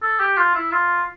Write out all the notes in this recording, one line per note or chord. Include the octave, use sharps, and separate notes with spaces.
A4
G4
F4
E4
F4